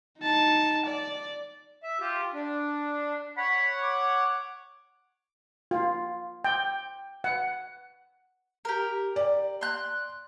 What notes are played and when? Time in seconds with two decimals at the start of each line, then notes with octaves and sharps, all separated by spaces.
0.19 D#4 A5
0.86 D5
1.83 E5
2.00 F4 G4
2.34 D4
3.38 C#5 F#5 B5
3.83 D6
5.71 F4
6.44 G5
7.24 F#5
8.65 G4 A#4
9.16 D5
9.61 C6 F#6